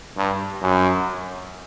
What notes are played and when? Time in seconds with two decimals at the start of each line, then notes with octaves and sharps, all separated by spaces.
0.17 G2
0.62 F#2